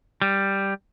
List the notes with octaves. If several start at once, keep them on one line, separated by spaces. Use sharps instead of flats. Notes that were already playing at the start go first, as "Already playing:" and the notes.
G3